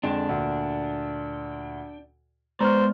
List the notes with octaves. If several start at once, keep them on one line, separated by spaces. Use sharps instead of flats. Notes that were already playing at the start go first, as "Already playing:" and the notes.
F2 D3 G#3 D4 G5
D2 A#2
G#3 B3 C5 D5 A#5 C#6 F6